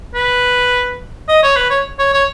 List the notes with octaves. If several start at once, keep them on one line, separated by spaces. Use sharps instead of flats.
B4
D#5
C#5
B4
C#5
C#5
C#5